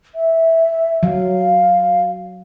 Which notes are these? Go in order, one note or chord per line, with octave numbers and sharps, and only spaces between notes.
E5
F#3 F5